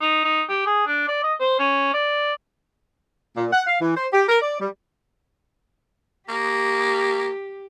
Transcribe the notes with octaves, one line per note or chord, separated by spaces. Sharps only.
D#4
D#4
G4
G#4
D4
D5
D#5
C5
C#4
D5
A#2
F#5
F5
E3
C5
G4
A#4
D5
G3
A#3 G4